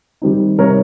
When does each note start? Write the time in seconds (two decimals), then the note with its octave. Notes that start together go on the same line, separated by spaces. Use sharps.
0.22 D#3 G3 C4 D#4
0.58 C3 G3 C4 D#4 A#4 C#5